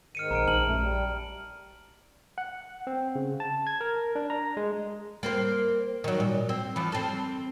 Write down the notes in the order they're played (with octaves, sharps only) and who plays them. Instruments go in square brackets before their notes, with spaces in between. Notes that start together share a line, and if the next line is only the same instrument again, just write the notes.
[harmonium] G#2 D#3 [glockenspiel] F6 C#7 D#7
[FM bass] A#1 [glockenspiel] A#5 F6 D7
[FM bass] A#1 [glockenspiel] A5 F6 F#7
[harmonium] F#2 A3
G3
[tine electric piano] F#5
C4
C#3
A5
G#6
A#4
D4
A#5
G#3
[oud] A#3 C4 C5
D#3 F#3
A#2
C4
E3 F3
C4 A4